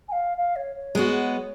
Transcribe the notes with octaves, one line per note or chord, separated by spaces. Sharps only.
G#5
F5
F5
C#5
C#5
G#3 B3 F#4